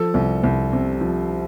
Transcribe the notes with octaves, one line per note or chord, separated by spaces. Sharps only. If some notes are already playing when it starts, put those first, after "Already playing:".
Already playing: F3 A4
C2
C2
C3
F3